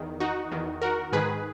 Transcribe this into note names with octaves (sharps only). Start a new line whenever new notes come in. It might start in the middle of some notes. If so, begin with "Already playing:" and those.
Already playing: E2 D#3
D#4 F#4
E2 D#3
F#4 A#4
G#2 D#3 G#4 B4